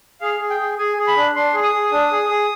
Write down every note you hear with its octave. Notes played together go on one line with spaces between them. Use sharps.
G#4 F5
G#4
G5
G#4
G#4 G#5
G#4
B5
D4
D4 C6
G#4
D#6
G#4
D4
G#4
G#4